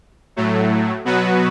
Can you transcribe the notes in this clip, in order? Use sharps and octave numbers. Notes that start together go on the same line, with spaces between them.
A2 F#3 A3
B2 F#3 B3 F#4 B4